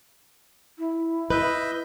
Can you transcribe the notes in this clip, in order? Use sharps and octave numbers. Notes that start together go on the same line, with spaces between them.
E4
B4 D#5 E5 G6